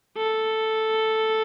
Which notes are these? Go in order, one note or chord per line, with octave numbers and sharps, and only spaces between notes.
A4